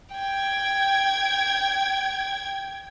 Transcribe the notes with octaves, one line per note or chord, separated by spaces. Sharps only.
G5 G#6